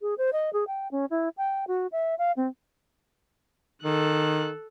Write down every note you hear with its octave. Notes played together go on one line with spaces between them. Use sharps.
G#4
C5
D#5
G#4
G5
C#4
E4
G5
F#4
E5
F5
C4
D#3 A4 F#6